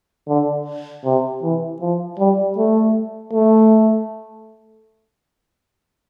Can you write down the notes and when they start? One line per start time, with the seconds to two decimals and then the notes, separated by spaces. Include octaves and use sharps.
0.28 D3
1.05 C3
1.43 E3
1.81 F3
2.19 G3
2.58 A3
3.34 A3